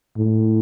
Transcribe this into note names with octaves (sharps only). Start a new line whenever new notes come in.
A2